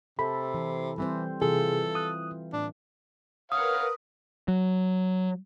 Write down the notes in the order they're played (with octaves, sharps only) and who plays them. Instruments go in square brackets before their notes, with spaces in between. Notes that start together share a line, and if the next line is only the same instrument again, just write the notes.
[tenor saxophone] C3 [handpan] A4 [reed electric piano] B5
[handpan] E3
[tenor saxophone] E3 [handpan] G3 C4 C5
[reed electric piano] C3 G#4 [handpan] E3 F4 [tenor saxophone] A4
[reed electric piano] D#6 F#6
[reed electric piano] A2 [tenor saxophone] D4
[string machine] A#4 B4 [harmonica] C#5 F5 F#5 [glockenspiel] D#6
[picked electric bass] F#3